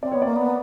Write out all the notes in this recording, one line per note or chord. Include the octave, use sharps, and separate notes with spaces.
C4 D5
B3 C#5
A#3 D5
B3